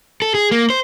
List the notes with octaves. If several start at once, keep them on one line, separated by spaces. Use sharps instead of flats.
A4
G#4
A#3
C5